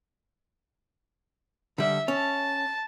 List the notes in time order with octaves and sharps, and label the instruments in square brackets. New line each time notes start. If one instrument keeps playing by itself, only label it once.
[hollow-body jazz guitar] D3 G3 [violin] E5
[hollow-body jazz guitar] C#4 [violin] A5